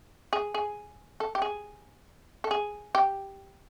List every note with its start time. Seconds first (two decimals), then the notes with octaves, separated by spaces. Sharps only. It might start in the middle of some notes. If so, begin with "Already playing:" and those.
0.33 G#4
0.54 G#4
1.20 A4
1.35 G4
1.42 G#4
2.44 A4
2.51 G#4
2.95 G4